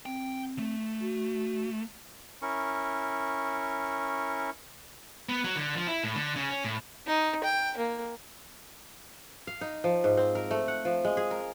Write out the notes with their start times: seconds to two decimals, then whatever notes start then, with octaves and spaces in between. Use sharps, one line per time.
0.06 C4 G5
0.59 A3
1.01 F#4
2.42 C#4 E4 A#4 C#6
5.29 B3
5.44 F#3
5.56 D3
5.75 F3
5.87 E4
6.04 A2
6.15 D3
6.36 C#3
6.49 C#4
6.65 A2
7.07 D#4
7.44 G5
7.77 A#3
9.47 F5
9.61 D#4
9.84 F3
10.04 G#2
10.17 C4
10.35 A#4
10.51 A3
10.68 F#5
10.85 F3
11.05 G#3
11.17 G#4
11.31 A#4